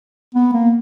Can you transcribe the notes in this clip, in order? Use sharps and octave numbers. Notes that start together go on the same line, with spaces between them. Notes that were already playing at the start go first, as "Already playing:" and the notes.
B3
A#3